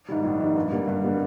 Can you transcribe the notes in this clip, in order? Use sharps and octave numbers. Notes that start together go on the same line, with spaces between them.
G#2 D#3 G3
A#1
G#2 D#3 G3
G2
D3 G3 A#3
G2
D3 G3 A#3